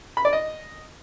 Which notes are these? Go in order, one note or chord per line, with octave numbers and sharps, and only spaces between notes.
B5
D5
D#5